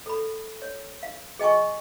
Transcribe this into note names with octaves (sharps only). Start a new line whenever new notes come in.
A4 B5
C#5
F5
G#4 D#5 G5 G#5 C#6